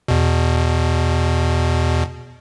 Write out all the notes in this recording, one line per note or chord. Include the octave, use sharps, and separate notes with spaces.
E2 B2